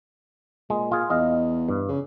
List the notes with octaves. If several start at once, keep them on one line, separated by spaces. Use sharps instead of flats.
A#2 G#3
F4 G#4
E2 D#5 F5
G2
C#3